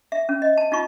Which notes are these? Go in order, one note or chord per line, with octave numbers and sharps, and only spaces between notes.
E5
C#4
D#5
A5
D#4 F4 C#6